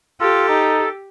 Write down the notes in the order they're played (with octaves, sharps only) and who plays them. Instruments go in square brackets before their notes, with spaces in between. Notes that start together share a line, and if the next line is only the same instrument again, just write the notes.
[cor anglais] F4 [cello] G4 [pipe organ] A4
[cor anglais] D#4